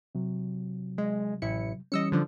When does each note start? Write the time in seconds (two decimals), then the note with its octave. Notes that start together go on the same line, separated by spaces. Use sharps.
0.15 C3 F#3
0.98 G#3
1.42 A1 E4 C#7
1.92 E3 G3 C#4 D#5 E6 C#7
2.12 D3 F3 D4